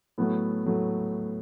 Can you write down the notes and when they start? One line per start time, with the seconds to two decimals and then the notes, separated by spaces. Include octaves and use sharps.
0.18 A2 F#3 A3 B3
0.65 A2 F#3 A3